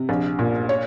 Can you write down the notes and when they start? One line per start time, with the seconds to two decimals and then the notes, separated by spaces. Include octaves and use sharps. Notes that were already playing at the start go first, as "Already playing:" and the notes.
Already playing: C3
0.09 A#1
0.39 A#2
0.69 C#5